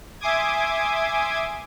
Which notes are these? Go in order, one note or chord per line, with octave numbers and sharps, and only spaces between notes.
E5 G#5 C6 D6 D#6 G#6